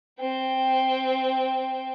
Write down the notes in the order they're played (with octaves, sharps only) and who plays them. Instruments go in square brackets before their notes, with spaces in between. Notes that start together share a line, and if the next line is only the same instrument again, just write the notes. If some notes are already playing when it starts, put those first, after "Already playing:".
[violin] C4 G5